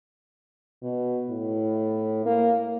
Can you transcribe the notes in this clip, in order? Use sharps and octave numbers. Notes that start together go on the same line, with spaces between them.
B2
A2
A#3